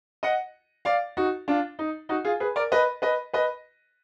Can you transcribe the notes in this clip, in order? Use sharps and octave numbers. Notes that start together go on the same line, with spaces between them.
D#5 F#5
D5 F5
D#4 F#4
D4 F4
D#4
D#4 F#4
F4 G#4
G#4 B4
A#4 D5
B4 D#5
B4 D#5
B4 D#5